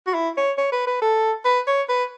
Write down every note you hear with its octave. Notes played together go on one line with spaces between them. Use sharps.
F#4
E4
C#5
C#5
B4
B4
A4
B4
C#5
B4